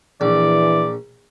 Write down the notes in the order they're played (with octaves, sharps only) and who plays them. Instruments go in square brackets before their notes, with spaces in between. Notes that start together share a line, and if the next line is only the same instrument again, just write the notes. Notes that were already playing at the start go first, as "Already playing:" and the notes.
[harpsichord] A#1 [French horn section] E3 [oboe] D5